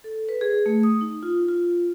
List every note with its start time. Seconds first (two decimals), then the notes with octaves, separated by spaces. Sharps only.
0.04 A4
0.29 B4
0.41 G#4
0.66 A3
0.83 D#6
1.01 D#4
1.23 F4
1.49 F4